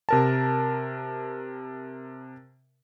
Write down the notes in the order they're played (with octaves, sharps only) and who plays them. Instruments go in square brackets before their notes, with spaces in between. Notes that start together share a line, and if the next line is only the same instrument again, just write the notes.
[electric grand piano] C3 A#4 A5